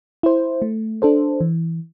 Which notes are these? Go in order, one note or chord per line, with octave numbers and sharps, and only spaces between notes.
E4 C5
A3
D4 A4 C5
E3